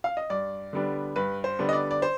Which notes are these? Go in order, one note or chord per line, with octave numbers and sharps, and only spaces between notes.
F5
D#5
G2 D5
D3 G3 B3 D4
G2 B4
C5
D3 G3 B3 D4
D#5
D5
D5
C5